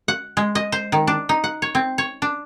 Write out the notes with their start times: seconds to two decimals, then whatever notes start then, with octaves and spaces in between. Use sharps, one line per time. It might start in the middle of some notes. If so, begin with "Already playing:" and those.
0.08 F#5
0.37 G#3
0.55 D#5
0.72 C5
0.92 D#3
1.07 D4
1.29 D#4
1.44 F#5
1.62 C#5
1.75 C4
1.98 C#5
2.22 D4